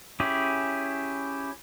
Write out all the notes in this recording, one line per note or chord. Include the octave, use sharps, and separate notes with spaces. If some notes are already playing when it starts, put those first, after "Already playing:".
C#4 E4 G4 G#4